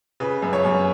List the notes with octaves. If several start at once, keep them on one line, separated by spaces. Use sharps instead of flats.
C#3 B4
F#2 B4
C#5
F#2